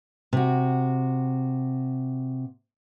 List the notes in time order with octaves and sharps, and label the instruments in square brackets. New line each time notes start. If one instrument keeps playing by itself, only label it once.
[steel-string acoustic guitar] C3 F#4